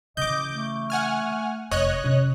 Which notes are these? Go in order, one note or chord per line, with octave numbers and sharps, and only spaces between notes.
C#3 E3 D#5 D6 G6
A3
F#5 G#5 F6
F1 C#5 D#5 F#6
C3 C#4